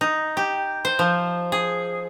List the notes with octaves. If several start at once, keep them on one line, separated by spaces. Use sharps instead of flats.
D#4
G4
C5
F3
G#4